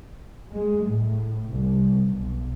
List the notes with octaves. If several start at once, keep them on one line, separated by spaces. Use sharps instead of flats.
G#3
A2
C2
B1